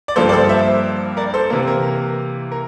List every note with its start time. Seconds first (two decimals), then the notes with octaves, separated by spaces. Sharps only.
0.08 D5
0.16 G2 F3 A#3 A4 C5
0.29 D5
0.32 A4 C5
0.49 C5 E5
1.17 A#4 D5
1.34 A4 C5
1.50 C3 E3 A#3 A#4
1.67 A#4
2.51 A#4